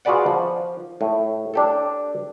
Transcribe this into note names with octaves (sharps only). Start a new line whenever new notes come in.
F4 F#4 G#4 B4 D5 F#5
F3
A2
D4 G4 A4